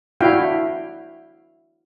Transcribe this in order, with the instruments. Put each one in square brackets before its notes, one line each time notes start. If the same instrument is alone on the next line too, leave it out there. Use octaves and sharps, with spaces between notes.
[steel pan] D4 E4 F#4 F5 G5